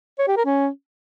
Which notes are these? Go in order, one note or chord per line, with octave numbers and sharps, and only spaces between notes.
C#5
G4
A#4
C#4